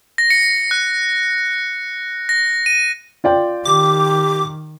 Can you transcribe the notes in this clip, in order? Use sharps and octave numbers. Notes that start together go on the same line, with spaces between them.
A#6
C#7
F#6
A#6
D#7
F4 D5 G5
D#3 G4 D6